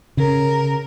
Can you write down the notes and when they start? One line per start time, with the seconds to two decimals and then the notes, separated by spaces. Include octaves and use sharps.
0.17 C#3 A#4